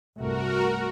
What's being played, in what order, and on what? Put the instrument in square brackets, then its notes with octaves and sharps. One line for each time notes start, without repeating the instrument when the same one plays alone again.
[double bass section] C2 G2 A3 [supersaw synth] F#4 A#4